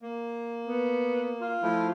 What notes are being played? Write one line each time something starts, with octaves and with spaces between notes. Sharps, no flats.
A#3
B3
F4
F3 A3 E4